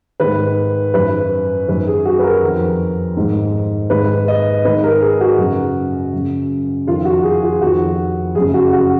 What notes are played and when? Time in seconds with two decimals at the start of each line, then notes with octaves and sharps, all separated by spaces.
0.20 G#2 D#3 B4
0.94 F#2 D#3 B4
1.68 F#2 D#3 B4
1.87 G#4
2.05 F#4
2.19 B4
2.24 A#4
2.43 F2 D#3
3.17 G#2 D#3
3.90 G#2 D#3 B4
4.28 D#5
4.65 G#2 D#3 B4
4.84 A#4
5.01 G#4
5.20 F#4
5.38 F#2 C#3
6.13 F#2 C#3
6.87 F2 D#3 F4
7.05 F#4
7.23 G#4
7.43 F4
7.61 F2 D#3 F#4
8.35 F#2 C#3 G#4
8.54 F#4
8.73 F#4